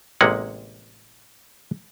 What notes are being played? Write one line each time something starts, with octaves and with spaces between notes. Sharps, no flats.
A1 C3 G#3 A#3 G4 F#5